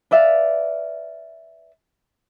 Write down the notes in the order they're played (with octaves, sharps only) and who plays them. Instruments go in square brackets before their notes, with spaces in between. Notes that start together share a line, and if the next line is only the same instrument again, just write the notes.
[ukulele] B4 D5 E5 F5